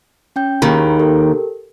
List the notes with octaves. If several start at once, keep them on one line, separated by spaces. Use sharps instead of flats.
C#4 G5 G6
D#2 D#3 G4 G#4 B5
G4 A4 A#4